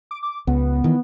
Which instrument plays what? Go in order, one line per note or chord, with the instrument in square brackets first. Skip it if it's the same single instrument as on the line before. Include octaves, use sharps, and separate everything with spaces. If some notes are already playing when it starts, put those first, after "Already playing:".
[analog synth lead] D6
D6
[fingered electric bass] C#2 [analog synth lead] B3
[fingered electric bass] D#3 E3